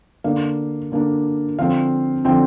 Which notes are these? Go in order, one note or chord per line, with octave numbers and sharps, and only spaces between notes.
D3 A#3 D4 F5
D3 A#3 D4
D3 F3 C4 F5
D3 F3 C4 G5